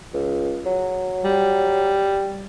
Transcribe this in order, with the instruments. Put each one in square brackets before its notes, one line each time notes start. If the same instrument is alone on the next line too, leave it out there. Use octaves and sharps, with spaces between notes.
[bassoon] C#2
F#3
[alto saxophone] G3